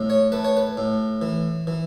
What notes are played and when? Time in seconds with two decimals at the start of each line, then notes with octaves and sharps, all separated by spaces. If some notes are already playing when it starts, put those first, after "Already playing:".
Already playing: A2
0.10 C#5
0.32 A3 B4
0.44 C#5
0.57 B4
0.77 A2
1.22 E3
1.67 E3